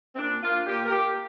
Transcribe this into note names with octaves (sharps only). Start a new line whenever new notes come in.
C4
A#2 D4
A#3 F4
A#2 G4
A#4
A#3 G4